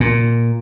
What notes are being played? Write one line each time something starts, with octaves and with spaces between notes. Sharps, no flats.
A#2